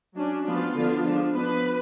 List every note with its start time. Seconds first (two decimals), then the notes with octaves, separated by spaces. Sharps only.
0.14 F#3 C#4 D4
0.45 F3 B3 D4 F4
0.74 D3 F3 B3 D4
1.05 F3 G#3 D4
1.35 F3 B3 D4 B4